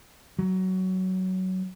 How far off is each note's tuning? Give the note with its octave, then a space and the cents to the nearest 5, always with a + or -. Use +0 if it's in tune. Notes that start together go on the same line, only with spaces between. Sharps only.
F#3 +15